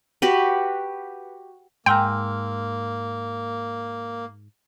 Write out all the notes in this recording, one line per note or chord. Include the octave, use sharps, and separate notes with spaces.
F#4 G4 B4
G#2 A#3 G5 G#5 A#5 C6 E6 F6